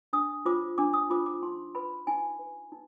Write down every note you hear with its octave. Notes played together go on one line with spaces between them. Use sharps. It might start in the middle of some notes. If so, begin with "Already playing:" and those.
D4 D#6
F4 C5 D6
D4 D6
D#6
F4 C5 D6
D6
D#4 C6
B4 B5
D#4 G#5
B4
D#4